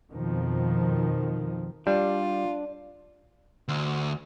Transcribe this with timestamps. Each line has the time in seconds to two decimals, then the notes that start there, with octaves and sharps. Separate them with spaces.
0.11 F2 B2 D#3 F3
1.87 G3 D4 F4 D5
3.68 D2